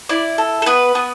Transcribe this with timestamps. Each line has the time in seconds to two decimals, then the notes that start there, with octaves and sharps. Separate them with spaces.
0.09 E4 D5
0.38 A4
0.62 A4
0.66 B3 B4
0.95 B3